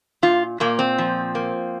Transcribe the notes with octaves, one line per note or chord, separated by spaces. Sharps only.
A#2 F4
A#2 A#3
C4
F3
A#3